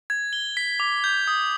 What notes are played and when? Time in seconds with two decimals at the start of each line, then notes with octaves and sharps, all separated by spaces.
0.10 G#6
0.33 G7
0.57 B6
0.80 D6
1.04 G6
1.27 D#6